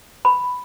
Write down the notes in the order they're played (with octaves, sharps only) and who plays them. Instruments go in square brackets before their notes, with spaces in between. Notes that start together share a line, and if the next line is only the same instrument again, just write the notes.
[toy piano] B5